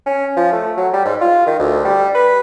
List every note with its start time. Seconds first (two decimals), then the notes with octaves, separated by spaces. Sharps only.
0.06 C#4
0.37 F3
0.52 A3
0.77 F#3
0.93 G3
1.05 G#2
1.21 F4
1.46 D#3
1.59 D2
1.85 G3
2.15 B4